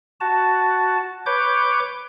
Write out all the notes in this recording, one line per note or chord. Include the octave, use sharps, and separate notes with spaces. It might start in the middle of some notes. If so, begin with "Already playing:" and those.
F#4 A5
B4 C#5 D6 G6